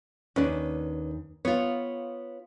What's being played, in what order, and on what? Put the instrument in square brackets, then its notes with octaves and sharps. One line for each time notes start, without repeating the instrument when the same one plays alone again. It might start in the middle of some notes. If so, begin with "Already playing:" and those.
[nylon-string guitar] D#2 D4 [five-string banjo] C#4 B4
[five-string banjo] B3 [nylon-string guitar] F4 C#5